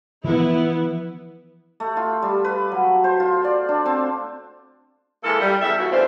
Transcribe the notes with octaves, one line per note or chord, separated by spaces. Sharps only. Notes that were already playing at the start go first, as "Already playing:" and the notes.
E3 F3 B3 E4
A3
F4
G3
B4
F#3
C5
F4
D5
D4
C4
E3 G#3 A#3 A4
G3
E2 C#3 A4 E5
D#2 E3 F#4
E2 E3 A3 D4 C5 F5